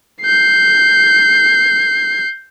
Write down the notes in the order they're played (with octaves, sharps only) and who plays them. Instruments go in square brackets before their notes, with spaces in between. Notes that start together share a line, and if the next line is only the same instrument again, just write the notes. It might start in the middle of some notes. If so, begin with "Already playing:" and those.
[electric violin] G6 C7